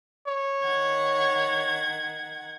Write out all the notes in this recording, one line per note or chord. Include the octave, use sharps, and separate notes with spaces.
C#5
D#3 F#5 G#6